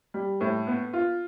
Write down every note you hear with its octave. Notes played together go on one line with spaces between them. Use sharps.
G3
A2
B3
F4